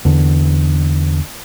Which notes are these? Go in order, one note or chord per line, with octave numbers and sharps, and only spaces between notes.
E2 D3